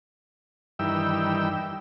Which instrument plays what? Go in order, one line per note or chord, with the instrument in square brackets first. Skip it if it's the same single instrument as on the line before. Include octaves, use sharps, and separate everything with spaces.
[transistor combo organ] G2 D#3 E3 G5 E6